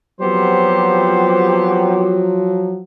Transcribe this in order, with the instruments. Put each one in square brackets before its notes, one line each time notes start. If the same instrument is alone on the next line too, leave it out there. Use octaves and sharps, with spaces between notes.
[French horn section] F3 F#3 [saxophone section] B3 C4 G4 [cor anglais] C5